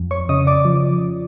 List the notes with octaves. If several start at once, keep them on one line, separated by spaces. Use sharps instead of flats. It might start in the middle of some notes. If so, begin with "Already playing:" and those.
Already playing: F2
C#5 C#6
C#3 D#5 D#6
D5 D6
F3